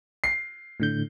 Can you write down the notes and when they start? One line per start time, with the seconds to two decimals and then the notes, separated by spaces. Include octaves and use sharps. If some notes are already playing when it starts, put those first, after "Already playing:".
0.24 C7
0.80 A2 D3 G6